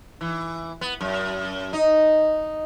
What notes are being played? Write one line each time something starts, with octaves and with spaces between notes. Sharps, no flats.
E3
B3
F#2
D#4